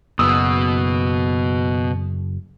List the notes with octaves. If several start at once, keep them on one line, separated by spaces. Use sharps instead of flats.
F#1 B2 B3 D#6 E6